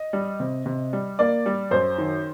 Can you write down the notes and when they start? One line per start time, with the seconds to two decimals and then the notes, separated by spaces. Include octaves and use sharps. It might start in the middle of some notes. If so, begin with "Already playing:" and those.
Already playing: D#5
0.13 G3
0.40 C3
0.66 C3
0.93 G3
1.19 A#3 D5
1.46 G3
1.71 F#2 C5
1.98 D#3